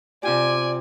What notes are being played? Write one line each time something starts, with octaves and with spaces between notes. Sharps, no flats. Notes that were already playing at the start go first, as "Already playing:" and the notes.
C3 F4 G4 D5 G#5